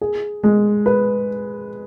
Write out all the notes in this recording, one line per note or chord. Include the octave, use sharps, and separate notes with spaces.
G#4
G#3
B4